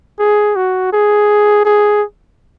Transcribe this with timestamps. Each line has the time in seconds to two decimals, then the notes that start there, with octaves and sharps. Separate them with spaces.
0.19 G#4
0.56 F#4
0.93 G#4
1.65 G#4